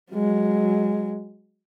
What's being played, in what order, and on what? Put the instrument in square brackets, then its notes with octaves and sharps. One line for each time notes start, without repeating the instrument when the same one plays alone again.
[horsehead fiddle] F#3 G#3